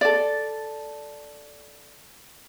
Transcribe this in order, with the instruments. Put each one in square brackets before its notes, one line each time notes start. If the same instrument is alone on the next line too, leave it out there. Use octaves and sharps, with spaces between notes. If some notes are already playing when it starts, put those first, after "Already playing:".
[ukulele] A4 D5